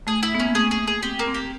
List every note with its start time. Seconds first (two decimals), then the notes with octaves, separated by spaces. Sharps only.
0.07 A3 G#4
0.23 E4
0.35 B3
0.40 C#4
0.46 A#3
0.55 A3 G#4
0.71 G#4
0.87 G#4
1.03 C4 G4
1.19 A#3
1.27 C4
1.34 G4